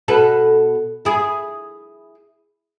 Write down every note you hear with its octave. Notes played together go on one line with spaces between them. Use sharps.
B2 A4 B4
E4 G#4